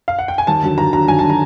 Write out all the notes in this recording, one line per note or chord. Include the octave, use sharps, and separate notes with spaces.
F5
F#5
G5
G#5
D#2 A5
D3 F#3
D#2 A#5
D3 F#3 A#5
D#2 G#5
A5
D3
F#3 A#5